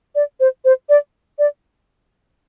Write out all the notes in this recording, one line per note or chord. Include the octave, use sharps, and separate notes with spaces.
D5
C5
C5
D5
D5